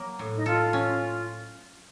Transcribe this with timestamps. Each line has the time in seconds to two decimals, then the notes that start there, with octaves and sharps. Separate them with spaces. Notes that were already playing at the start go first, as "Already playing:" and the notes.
Already playing: F#3 A#3
0.19 A2
0.36 D#4
0.46 F4 A4
0.73 C#4